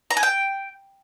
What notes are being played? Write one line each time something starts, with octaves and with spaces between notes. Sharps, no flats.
A#5
G#5
G5